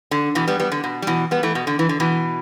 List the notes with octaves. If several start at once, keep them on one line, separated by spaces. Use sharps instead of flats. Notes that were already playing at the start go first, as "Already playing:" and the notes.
D3
B2 E3
G3 B3
G3 B3
D3
B2
G3
B2 E3
G3 B3
E3 A3
B2
D3
E3
D3
B2 E3